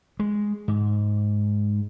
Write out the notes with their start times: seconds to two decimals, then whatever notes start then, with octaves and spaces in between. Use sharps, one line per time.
0.19 G#3
0.68 G#2